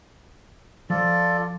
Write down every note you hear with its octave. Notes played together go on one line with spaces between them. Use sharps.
F3 F4 A4 D5